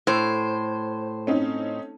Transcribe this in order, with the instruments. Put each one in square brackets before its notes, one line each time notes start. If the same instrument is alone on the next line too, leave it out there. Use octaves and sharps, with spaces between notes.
[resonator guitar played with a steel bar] A2 [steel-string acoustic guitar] C5
[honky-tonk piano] C4 C#4 D#4